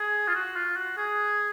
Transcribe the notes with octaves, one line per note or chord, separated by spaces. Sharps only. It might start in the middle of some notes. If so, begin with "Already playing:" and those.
Already playing: G#4
F4
F#4
F4
F#4
G#4